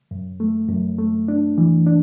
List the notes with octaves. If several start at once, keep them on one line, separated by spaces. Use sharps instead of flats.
F#2
A3
F#2
A3
D4
E3
D4